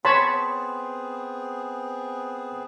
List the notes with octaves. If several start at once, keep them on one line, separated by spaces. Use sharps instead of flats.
B3 C4 G#4 C#5 A5 B5 C6